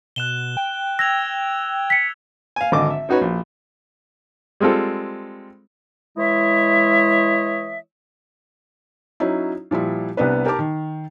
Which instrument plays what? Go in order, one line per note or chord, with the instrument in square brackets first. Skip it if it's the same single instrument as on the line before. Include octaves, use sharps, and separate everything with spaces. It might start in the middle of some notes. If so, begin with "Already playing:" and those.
[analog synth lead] B2 [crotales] F#6 E7 G7
[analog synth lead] G5
[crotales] E6 G#6 F7 [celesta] A#6
[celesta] B6 C#7
[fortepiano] F5 G#5
G#1 D3 D#5 D6
E5
C#4 D#4 F#4 B4 C#5
A#1
G3 G#3 C4 F4 A4
[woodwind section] E3 G#3 E4 C#5 D#5 E5
[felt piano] F#3 C#4 D#4 E4
A#2 F3 G3 E4
C2 C3 B3 D4 B4
G4 A#4 G5 A5 D6
D#3